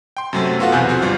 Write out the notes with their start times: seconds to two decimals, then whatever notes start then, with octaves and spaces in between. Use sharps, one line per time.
0.17 G5 C6
0.33 F#2 C3 F#3 A3 C4
0.59 B3 F4 F#4 A4 F5 F#5
0.72 B1 E2 C3 G#5 F#6 G6
0.89 F3 C4 F#4
1.02 G1 G3 F4 F5